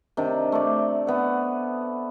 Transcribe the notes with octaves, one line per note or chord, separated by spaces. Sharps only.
C3 D#3 D4
A3 D5
B3 F#5